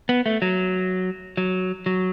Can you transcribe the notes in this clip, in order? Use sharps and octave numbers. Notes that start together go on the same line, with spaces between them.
B3
A3
F#3
F#3
F#3